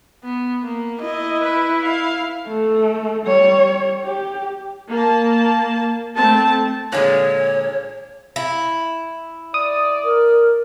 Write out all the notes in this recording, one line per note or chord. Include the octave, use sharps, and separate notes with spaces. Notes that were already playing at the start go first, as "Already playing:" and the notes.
B3
A#3
E4 D#5
B4
F5
A3
G3 C#5
G4
A#3 A5
A3 C4 A5
A#2 D3 G#3 C#5
E4
D5 D#6
A#4